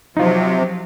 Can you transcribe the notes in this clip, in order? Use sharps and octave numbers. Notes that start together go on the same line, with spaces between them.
C3 F3 F#3 D#4 F4